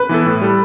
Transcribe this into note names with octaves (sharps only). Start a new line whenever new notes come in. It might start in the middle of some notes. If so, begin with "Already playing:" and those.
Already playing: B4
E3 B3 E4 A4
A2
G3 E4 A4